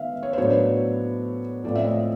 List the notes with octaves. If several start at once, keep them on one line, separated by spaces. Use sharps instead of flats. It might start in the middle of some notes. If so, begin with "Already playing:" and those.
Already playing: D#3 B3 E5 F5
C#5
C5
A2 F#3 B3 D4 C#5
A2 F3 A3 C4 D5
E5
D#5